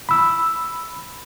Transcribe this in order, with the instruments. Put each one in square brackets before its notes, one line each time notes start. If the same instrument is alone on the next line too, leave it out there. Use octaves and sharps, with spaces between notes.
[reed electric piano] B5 E6